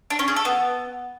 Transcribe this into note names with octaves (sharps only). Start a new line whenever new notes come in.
D4
C#4
G#4
A4
B3